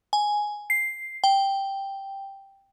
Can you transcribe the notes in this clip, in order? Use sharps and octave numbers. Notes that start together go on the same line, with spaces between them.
G#5
C7
G5